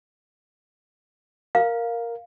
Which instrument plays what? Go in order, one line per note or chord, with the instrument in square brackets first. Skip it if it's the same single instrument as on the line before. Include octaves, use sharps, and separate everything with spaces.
[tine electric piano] A#4 [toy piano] F5